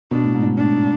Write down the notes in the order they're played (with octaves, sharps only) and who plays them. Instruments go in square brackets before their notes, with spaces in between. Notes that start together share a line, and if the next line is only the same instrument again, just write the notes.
[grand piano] B2 [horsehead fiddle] D4
[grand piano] A2
G#2
A2
[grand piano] A2 [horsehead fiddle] D4